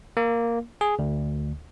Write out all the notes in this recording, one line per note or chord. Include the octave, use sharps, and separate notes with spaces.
A#3
G#4
D2